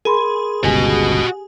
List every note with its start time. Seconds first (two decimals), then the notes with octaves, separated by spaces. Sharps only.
0.05 G#4 A#4 B5 C6
0.64 G1 C#2 B2 F#4 G4 D#5 G#5